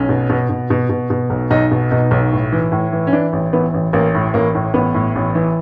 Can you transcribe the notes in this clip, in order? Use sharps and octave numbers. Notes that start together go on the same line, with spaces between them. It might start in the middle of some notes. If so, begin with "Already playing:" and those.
Already playing: B1 C#4
B2
B2
B2
B2
B2
B2
B1
B1 D#4
B2
B2 D#4
B1
A2
E3
A2
E3
C#4
E3 D4
A1
E3 B3
A1
A1 A#3
A2
A1 A#3
A2
A1 B3
A2
A1
E3